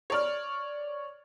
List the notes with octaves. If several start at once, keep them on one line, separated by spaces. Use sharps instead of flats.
C#5 D5 F6